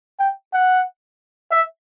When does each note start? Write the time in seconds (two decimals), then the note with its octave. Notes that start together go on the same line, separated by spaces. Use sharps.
0.19 G5
0.53 F#5
1.51 E5